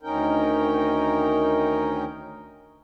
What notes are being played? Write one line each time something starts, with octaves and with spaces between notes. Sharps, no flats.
D2 D#3 C#4 D#4 A#4 G5